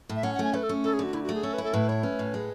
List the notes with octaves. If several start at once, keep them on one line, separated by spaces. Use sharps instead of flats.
A2
E5
C#4 F#5
F#5
A3 G#5
A3 B4
A4
C#4
D2 A4
G#4
D3 F#4
D2 E4
F#4
A3
G#4
C#4 A4
B4
E4
A4
A2 B4
E4 C#5
C#4 B4
A2
G#3